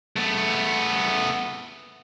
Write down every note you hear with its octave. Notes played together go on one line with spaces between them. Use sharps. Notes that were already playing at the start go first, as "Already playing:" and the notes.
A3 B3